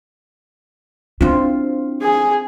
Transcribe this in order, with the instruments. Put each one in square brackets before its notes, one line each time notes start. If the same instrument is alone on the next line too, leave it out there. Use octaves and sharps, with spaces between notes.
[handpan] C4 F4 [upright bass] D4 E4
[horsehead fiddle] G#4